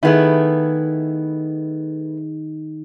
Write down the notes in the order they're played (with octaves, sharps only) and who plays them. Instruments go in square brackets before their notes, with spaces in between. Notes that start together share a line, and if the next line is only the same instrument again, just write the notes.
[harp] D#3 G#4 [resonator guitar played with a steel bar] A3 B3 E4